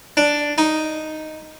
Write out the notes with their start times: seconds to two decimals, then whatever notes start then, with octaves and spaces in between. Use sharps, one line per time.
0.17 D4
0.58 D#4